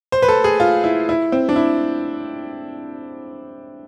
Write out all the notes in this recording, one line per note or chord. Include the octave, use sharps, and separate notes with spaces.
C5
B4
A4
G#4
F4
E4
E4
C4
D4
E4